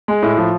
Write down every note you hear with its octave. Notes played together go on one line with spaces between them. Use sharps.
G#3
A2
F3